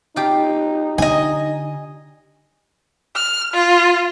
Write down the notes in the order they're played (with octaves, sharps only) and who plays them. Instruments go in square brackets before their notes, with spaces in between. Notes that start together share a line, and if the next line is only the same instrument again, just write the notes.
[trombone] D#4 [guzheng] F4 G4 F5
[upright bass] D3 [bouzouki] D#5 G#5
[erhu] F6
F4